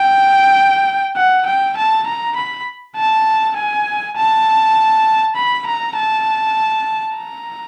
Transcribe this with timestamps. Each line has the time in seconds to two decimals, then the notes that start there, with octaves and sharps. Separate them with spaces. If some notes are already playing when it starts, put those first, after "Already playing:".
Already playing: G5
1.16 F#5
1.46 G5
1.77 A5
2.07 A#5
2.36 B5
2.97 A5
3.56 G#5
4.17 A5
5.36 B5
5.67 A#5
5.96 A5
7.16 A#5